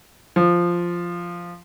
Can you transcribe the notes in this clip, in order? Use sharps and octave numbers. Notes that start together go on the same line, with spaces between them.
F3